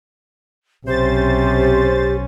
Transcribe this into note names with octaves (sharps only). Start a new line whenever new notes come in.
B1 C3 C#4 G4 C5 A6